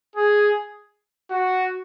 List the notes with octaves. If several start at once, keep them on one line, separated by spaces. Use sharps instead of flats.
G#4
F#4